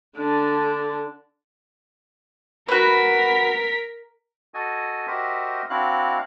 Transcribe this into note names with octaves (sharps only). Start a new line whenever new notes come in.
D3 D4
F#4 A#4 B4 B6
F#4 A4 D#5 G#5
F#4 G4 A#4 C5 D#5 E5
C4 D4 E4 F#4 F5 F#6